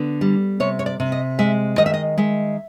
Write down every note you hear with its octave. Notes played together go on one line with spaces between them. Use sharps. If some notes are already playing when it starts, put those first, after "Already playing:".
Already playing: D3 B3
G3
C3 C#5
C#5
D5
C3
D#5
G#3 E5
D#3 D#5
E5
D#5
G#3 E5